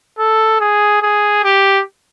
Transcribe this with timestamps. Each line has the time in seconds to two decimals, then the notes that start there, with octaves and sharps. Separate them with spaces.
0.19 A4
0.60 G#4
1.02 G#4
1.44 G4